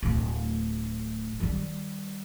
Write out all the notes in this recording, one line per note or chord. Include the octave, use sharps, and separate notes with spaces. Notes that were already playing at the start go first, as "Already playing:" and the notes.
D1 D2
D#3 G3